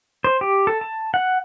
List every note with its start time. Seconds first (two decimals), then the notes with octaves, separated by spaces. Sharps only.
0.24 C5
0.41 G4
0.67 A4
0.81 A5
1.14 F#5